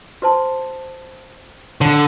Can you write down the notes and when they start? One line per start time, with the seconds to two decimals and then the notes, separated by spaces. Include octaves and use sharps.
0.22 F#4 C5 A5
1.81 D3 C#5